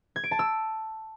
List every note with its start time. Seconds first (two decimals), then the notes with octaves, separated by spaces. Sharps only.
0.16 G#6
0.24 D7
0.31 A5
0.39 E6